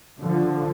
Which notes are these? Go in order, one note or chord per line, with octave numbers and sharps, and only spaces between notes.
D3 F3